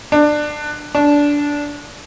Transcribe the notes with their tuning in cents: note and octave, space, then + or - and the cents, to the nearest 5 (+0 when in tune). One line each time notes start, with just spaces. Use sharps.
D4 +20
D4 -15